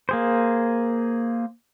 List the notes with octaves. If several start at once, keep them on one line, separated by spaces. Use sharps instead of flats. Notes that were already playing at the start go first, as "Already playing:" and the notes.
A#3 G#4 C5